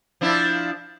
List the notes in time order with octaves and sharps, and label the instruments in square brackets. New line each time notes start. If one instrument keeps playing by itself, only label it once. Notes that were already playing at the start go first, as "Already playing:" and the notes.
[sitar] F3 D4 E4